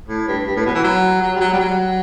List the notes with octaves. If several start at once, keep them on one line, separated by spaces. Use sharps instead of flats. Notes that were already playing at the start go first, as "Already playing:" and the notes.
A2
G2
G2
A2
B2
E3
F#3
F#3
G3
F#3
G3
F#3